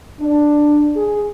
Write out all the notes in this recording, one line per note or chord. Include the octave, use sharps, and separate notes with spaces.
D4
G#4